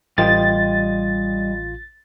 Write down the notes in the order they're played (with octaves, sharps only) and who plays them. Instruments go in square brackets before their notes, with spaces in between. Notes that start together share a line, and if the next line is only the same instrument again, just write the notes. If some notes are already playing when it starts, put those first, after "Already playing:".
[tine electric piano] A1 F4 [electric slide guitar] G3 D#5 G5 [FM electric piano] A6